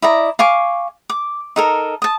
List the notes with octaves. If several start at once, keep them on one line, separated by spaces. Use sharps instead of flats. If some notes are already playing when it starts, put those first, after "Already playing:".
E4 D5 D#5 A#5
F5 G#5 C#6 D6
D6
D#4 A4 A#4
A5 D#6